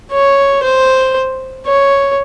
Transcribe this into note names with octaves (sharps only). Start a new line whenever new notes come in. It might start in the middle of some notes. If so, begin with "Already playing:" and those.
C#5
C5
C#5